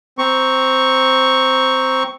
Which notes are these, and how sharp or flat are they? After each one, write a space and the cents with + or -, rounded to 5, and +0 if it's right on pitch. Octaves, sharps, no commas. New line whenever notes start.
C4 +0 A#5 +0 C#6 +0